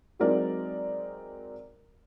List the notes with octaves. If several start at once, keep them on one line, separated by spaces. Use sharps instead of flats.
F#3 G#3 C4 D#4 A#4 D5